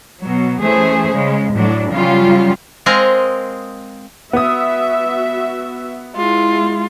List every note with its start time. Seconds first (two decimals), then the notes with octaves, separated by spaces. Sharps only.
0.21 B2 F#3
0.60 E3 A3 C#4 G#4 C5
1.11 C#3 G#3
1.52 A2 F#3 D4
1.90 C#3 F#3 G3 C#4 F4
2.86 G#3 C4 G#4 A#4 D#5 F5
4.33 B3 F#4 E5 D#6
6.16 G#3 E4 F4